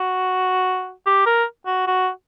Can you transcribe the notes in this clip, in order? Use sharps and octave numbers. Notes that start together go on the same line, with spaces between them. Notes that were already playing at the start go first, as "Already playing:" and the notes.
Already playing: F#4
G4
A#4
F#4
F#4